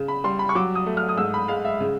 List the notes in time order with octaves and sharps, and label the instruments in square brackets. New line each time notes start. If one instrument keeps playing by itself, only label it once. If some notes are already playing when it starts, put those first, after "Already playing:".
Already playing: [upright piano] C#3
B5
G3 C6
B5
C#6
F#3 D6
D#6
A3
F6
D#6
G#2 E6
B5
G#3 F5
E5
C#3